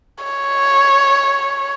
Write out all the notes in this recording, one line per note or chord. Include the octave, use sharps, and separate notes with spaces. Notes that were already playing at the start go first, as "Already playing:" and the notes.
C#5